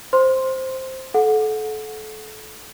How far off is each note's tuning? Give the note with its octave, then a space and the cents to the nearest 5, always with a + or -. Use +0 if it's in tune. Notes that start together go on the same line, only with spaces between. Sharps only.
C5 +0 C6 +0
A4 -30 F#5 -20